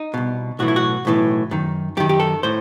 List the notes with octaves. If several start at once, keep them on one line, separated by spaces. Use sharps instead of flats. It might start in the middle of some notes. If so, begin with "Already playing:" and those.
Already playing: D#4
C2 B2
B1 A2 E3 F#4
E4
F#4
B1 A2 E3
F#2 D#3
F#2 D#3 G4
G4
A4
A2 C5